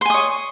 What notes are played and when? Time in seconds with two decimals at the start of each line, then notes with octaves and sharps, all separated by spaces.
0.01 C6
0.06 G#5
0.10 D#6
0.14 C#5